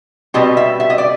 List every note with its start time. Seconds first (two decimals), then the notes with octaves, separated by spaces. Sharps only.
0.34 B2 G3 C4 D#5
0.57 E5
0.80 E5
0.90 D#5
0.98 D5